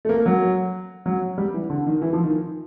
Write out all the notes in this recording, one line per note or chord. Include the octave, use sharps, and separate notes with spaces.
A3
A#3
F#3
F#3
G3
E3
D3
D#3
E3
F3
D#3